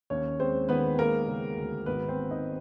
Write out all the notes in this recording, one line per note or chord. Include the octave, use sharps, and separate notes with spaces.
D#2 C#4 C#5
G#3 C4 C5
D#3 B3 B4
G#3 A#3 A#4
C#3
D2
G#1 B3 B4
C4 C5
A#3
D#4 D#5